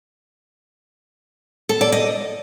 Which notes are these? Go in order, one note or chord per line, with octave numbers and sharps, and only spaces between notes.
A4
D5
D#5